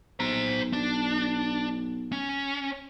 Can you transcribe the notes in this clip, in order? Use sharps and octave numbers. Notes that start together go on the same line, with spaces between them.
B1 C5 A#5
D4
C#4